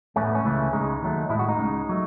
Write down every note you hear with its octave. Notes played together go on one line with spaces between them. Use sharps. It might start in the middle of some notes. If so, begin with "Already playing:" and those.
A2 E3 A3 C#4
B3
C#4
C#2 C#3 E3 A3
C#2 C#3 G#3 D#4
D#2 D#3 F#3 A3
A2 G#3 E4
F#4
D#4
C#2 C#3 G#3
F#3 A3